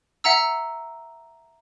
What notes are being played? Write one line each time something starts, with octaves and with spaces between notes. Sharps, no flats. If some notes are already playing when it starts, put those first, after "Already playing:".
E5 F#5 A#5 E6